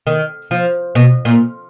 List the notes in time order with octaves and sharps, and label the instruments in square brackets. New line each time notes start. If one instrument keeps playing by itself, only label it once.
[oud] D#3
F3
B2
A#2